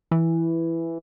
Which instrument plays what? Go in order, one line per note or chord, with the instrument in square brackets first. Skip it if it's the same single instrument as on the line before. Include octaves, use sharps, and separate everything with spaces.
[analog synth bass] E3